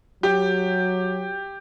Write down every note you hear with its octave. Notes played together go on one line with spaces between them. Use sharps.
F#3 G4